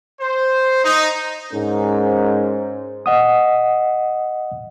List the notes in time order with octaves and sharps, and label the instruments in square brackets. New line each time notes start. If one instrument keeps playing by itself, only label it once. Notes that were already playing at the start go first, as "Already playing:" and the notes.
[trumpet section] C5
D#4
[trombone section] G#2 C#4 A#4 C5
[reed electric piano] D#5 F#5 D#6